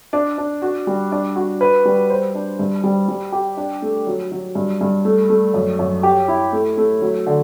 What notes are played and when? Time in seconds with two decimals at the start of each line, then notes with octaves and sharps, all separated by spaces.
0.13 D4
0.38 D4
0.62 F#4
0.87 G3
1.12 D4
1.36 F#4
1.61 B4
1.85 G3
2.10 C5
2.35 D4
2.59 G2
2.84 G3
3.08 G3
3.32 G4
3.57 D4
3.82 A3
4.07 F#3
4.32 F#3
4.55 G2
4.81 G2
5.05 A3
5.30 A3
5.54 F#2
5.79 F#2
6.03 G4
6.28 E4
6.53 A3
6.78 A3
7.02 F#3
7.27 D3